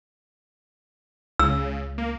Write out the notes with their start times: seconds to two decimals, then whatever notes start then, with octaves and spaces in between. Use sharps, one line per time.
1.39 C#2 C#3 E6
1.98 A#3